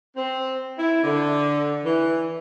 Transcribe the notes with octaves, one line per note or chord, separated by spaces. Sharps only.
C4
E4
D3
E3